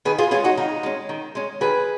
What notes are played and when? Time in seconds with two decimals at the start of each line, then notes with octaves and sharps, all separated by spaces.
0.05 D#3 G#4 B4
0.18 F4 G#4
0.31 G#3 C#4 F4 G#4
0.44 D#4 F#4
0.57 D#3 D#4
0.83 G#3 C#4
1.09 D#3
1.35 G#3 C#4
1.61 D#3 G#4 B4